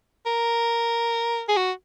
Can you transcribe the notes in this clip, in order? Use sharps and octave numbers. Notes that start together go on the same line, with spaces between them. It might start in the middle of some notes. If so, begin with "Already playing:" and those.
A#4
G#4
F#4